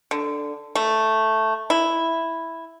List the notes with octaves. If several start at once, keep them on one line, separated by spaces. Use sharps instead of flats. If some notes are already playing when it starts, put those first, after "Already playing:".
D3
A3
E4